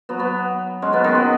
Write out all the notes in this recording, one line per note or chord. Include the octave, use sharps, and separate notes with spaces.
F#3 B3
F#3 B3
G#3 C#4
F#3 B3
D#3 G#3
F#3 B3